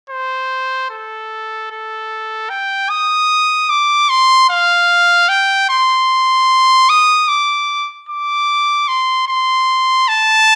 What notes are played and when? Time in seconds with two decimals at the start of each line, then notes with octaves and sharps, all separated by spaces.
0.10 C5
0.90 A4
1.71 A4
2.50 G5
2.90 D#6
3.70 D6
4.09 C6
4.49 F5
5.29 G5
5.69 C6
6.89 D#6
7.28 D6
8.09 D6
8.88 C6
9.28 C6
10.08 A5